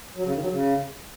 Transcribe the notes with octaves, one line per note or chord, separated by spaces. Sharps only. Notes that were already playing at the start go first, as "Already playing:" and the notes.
F#3
C#3
D#3
F#3
C#3